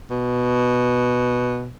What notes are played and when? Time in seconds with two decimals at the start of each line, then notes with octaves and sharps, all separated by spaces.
0.10 B2